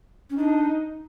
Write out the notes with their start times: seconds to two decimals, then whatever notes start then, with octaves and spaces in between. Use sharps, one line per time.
0.30 C#4
0.38 D4 D#4